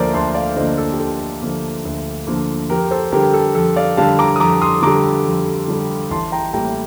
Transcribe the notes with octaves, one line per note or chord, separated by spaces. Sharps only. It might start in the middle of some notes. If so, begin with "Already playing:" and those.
Already playing: D2 D3 F3 A#3 A#4 C5 D5
D2 A5 C6
D5 F5
D3 F3 A#3 C5 D#5
A4
G4
D2 A4
D3 F3 A#3
D2
D3 F3 A#3
F2 G4 A#4
A4 C5
D3 G3 G4 A#4
A4
F2 A4
D5 F5
D3 G3 F5 A5
A#5 D6
D#6
F2 A#5 D6
C6 D#6
D3 G3 A#5 D6
F2
D3 G3
A1 A5 C6
G5 A#5
A2 G3 A#3 G5 A#5